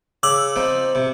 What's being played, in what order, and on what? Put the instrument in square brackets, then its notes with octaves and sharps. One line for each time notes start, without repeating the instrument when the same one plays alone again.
[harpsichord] C#3 [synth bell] D6 E6 F#7
[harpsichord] F3 C4 D#4
C3